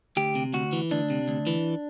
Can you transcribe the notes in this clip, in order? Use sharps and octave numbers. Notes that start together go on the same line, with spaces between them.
D2 G4
C3
D2 F#4
E3
D2 D4
C3
D2
E3